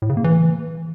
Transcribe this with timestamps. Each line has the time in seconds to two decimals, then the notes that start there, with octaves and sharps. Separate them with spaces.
0.02 A2
0.09 C#3
0.17 A#3
0.24 E3